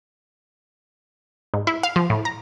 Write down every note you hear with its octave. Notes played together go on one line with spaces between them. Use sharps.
G#2
E4
F5
F3
A2
A#5